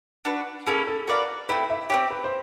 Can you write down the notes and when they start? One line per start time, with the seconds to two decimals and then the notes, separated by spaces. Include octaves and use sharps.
0.25 D4 F#4 B4
0.67 A#3 C#4 E4 G#4 A4
0.87 A4
1.08 F#4 A#4 B4 D5 F5
1.49 A3 C4 E4 B4
1.70 E5
1.90 C4 D#4 G4 C#5
2.11 B4
2.24 C5